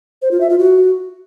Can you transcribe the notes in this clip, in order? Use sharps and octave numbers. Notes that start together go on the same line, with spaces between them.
C5
F4
E5
F4
F#4